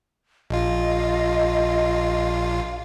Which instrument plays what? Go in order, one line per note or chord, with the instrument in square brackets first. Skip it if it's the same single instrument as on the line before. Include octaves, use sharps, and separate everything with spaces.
[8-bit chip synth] A#1 F4 [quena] D#5